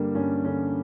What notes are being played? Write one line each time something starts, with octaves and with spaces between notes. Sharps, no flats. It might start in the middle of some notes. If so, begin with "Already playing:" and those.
Already playing: G2 D3 G3 A#3
G2 C#4
D3 C#4